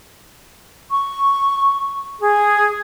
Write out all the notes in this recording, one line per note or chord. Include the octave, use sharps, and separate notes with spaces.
C#6
G#4